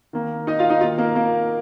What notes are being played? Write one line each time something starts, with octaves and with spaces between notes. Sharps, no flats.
D#3 A#3
D#4 D#5
F4 F5
D#4 D#5
D#3 A#3 F4
A#3 A#4
A#3 A#4